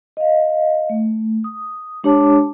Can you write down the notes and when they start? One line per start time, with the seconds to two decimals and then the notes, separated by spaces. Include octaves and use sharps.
0.17 D#5 F5
0.90 A3
1.44 D#6
2.04 G#3 D4 G4 C#5 A5 D6